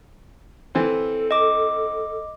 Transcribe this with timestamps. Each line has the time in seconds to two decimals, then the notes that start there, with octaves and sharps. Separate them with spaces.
0.75 E3 C4 A4
1.31 D#5 D6